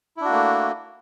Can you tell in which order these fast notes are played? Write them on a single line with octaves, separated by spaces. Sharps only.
E4 D4 F#4 A#3 A3